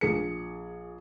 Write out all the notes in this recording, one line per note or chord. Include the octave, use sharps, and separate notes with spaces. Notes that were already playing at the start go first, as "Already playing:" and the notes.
A#1 G#4 C#7